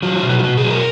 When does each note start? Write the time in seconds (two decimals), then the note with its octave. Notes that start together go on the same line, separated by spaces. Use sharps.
0.02 F#3 F4
0.16 F4
0.23 B2
0.30 F#4
0.39 F4
0.43 B2 F#4
0.57 G#4
0.64 F#3
0.71 A#4